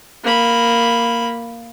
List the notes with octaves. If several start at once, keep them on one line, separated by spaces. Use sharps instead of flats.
A#3 B5